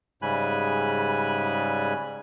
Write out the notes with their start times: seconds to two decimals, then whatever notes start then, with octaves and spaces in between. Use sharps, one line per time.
0.22 G#2 C#3 G3 G#5 B5 F#6